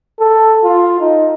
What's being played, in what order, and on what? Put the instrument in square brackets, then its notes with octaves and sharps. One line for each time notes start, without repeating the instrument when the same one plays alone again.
[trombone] A4
F4
D#4